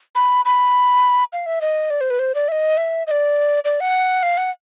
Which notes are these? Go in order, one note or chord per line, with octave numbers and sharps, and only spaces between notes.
B5
B5
F5
E5
D#5
D5
C5
B4
C5
D5
E5
D#5
E5
D#5
D5
D5
F#5
F5
F#5